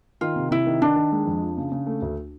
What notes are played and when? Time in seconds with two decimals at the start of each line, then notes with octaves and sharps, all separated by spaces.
0.21 D#3 F4
0.36 C3
0.51 C3 E4
0.66 D#3
0.82 D#3 D4
0.96 D#3
1.12 G#3
1.26 F2
1.42 F3
1.57 C#3
1.72 C#3
1.86 A3
2.02 D2